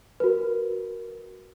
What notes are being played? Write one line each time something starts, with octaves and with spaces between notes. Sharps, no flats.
F#4 A#4 B4